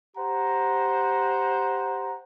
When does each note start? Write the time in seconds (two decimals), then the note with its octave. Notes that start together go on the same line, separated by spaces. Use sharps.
0.16 G4 C5 F#5 A#5